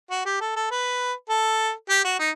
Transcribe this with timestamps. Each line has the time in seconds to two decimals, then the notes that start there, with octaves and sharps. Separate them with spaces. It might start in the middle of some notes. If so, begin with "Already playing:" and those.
0.10 F#4
0.25 G4
0.41 A4
0.56 A4
0.71 B4
1.29 A4
1.90 G4
2.04 F#4
2.19 D#4